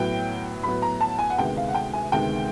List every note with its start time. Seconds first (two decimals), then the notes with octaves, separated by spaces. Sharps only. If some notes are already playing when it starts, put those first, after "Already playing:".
Already playing: A2 F#3 B3 G5
0.63 A2 F#3 B3 B5
0.82 A#5
1.01 A5
1.19 G#5
1.30 F#5
1.38 D2 C3 D#3 G#3 B3 G5
1.57 F5
1.68 F#5
1.74 G5
1.94 G#5
2.12 D2 C3 D#3 G#3 B3 G5